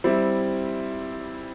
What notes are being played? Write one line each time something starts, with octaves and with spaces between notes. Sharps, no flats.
G3 C4 E4